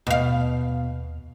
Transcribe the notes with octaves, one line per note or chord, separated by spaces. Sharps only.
D#2 B2 F5